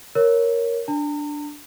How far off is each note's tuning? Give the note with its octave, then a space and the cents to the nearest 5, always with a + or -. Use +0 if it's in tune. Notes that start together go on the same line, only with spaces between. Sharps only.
A#4 +0 C#5 +0
D4 +0 A#5 -45